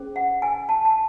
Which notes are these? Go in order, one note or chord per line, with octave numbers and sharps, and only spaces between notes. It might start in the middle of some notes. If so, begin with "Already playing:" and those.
Already playing: C#4 G#4 C5
F#5
G#5
A5
A5